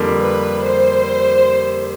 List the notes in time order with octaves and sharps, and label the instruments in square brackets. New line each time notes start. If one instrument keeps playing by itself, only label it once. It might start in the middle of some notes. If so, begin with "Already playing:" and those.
Already playing: [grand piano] F2 D3 G3 A#3
[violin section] B4
C5